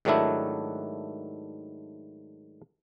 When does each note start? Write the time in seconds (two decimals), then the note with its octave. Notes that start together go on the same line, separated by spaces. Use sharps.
0.05 G#2 D#3 F#3 A3 D4 E4